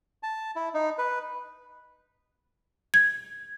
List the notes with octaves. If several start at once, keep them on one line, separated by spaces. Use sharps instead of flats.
A5
E4
D#4
B4
G#6